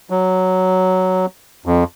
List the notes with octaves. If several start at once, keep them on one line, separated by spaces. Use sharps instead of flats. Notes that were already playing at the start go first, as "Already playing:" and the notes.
F#3
F2